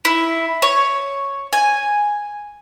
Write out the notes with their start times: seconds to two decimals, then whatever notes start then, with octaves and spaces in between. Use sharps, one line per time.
0.05 E4
0.62 C#5
1.53 G#5